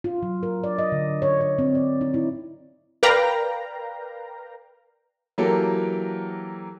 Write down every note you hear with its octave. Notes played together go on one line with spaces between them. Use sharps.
F4
F#3
A#4
D5
D#5
D3
C#5
C#5
C4
D5
D#4
E4
A#4 B4 D5 F5 G5 A#5
E3 F#3 A#3 G4 A4 A#4